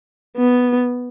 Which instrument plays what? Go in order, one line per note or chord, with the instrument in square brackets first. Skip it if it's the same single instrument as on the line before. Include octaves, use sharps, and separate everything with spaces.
[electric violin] B3